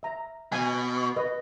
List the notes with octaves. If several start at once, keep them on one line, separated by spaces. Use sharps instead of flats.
E5 A#5
B2 G#5
B4 D#5